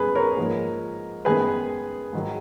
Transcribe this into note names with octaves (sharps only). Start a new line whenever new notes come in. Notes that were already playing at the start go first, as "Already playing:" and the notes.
Already playing: F#2 G#3 B3 G#4 B4
A#4 C#5
G#2 F3 A#3
F#2 D#3 G#3 B3 G#4 B4
G#2 D#3 F#3